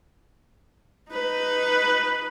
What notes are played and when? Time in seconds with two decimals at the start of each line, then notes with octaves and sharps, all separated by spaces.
1.11 D#4 B4